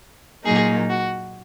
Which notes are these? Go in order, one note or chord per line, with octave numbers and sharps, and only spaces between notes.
A#2 F#3 A#3 D#4 G#4
F#4